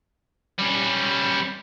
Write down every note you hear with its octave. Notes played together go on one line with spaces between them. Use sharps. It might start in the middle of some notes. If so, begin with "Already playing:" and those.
G3 C#4